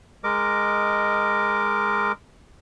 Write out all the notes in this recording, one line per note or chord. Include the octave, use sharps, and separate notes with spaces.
G#3 A#4 D#5 D6